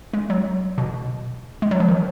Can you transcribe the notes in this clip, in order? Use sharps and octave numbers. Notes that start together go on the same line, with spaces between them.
G#3
F#3
B2
G#3
F#3
F3
D#3